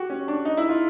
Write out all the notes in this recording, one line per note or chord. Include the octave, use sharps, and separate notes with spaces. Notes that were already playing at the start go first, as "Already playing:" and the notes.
Already playing: F#4 G4
C#4
D4
D#4
E4
F4